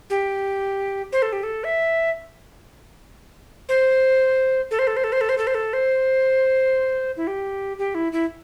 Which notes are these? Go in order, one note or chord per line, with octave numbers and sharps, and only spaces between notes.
G4
C5
A4
G4
A4
E5
C5
A4
C5
A4
C5
A4
C5
A4
C5
A4
C5
A4
C5
E4
G4
G4
E4
E4